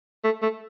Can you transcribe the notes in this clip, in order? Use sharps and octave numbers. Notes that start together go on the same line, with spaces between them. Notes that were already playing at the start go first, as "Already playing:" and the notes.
A3
A3